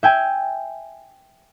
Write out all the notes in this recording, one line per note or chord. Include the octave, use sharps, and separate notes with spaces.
E5 G5 G#5